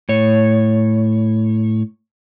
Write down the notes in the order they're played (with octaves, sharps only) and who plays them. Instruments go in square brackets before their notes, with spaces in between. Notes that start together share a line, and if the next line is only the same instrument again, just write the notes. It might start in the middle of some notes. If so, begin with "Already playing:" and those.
[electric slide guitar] A2 C#5